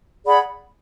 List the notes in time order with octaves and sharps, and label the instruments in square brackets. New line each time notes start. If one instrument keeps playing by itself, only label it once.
[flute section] G#4 D5 F#5 B5